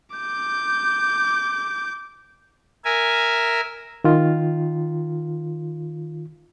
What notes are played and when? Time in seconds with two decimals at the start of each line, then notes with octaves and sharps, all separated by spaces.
0.16 D6 G6
2.85 A#4 E5 G#5
4.04 D#3 F4